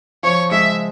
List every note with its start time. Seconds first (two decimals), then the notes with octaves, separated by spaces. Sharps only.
0.23 F3 C#5
0.51 G#3 E5